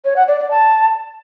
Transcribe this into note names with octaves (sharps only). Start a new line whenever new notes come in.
C#5
F#5
D5
D5
A5